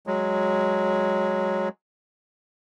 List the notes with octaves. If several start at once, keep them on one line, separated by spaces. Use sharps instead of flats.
F#3 G#3